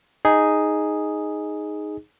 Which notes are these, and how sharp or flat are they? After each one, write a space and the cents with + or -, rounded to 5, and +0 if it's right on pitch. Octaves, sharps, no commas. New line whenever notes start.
D#4 +0 G#4 +0